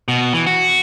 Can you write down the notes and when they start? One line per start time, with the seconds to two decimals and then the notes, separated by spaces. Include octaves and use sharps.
0.08 B2
0.33 E3
0.47 F#4